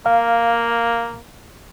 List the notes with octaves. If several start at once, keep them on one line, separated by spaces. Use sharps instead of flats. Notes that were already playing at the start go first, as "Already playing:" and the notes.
A#3 F5